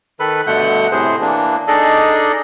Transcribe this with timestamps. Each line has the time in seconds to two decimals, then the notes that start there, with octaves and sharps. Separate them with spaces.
0.20 D#3 A4 B4 B5
0.47 G2 B2 D3 A3 F#5 G6
0.91 A2 C3 G#4 C5
1.22 E3 A#3 D4
1.68 D4 D#4 G#4 A4 D5 D#5